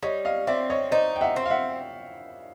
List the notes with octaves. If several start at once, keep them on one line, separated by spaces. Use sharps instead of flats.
G3 C#5 D#5
D#5 F5
C4 D5 E5
C#5 D#5
D#4 C5 D5
G5
E5 F#5
C4
F5
E5 F#5